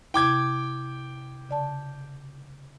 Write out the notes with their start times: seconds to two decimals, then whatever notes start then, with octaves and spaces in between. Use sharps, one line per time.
0.14 C3 E4 G5 D6 G#6
1.49 C#3 D5 A5